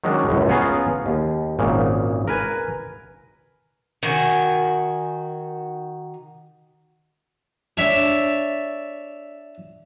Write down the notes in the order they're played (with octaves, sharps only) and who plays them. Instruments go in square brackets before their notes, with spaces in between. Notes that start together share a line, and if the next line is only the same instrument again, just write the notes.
[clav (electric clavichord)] D#3 F#3 G#3 C#4 D4
C#2 F#2 A2 C#3
B3 C#4 F4 G#4 F5 A#5
D#2
G#1 A#2 C#3
A#4 B4 G#5
[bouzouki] D#3 F#4 G#5
[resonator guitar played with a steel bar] D4 [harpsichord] C#5 E5